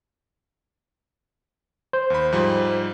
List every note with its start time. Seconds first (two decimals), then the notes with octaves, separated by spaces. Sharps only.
1.93 C5
2.10 D#2 B5
2.32 G#2 F3 G3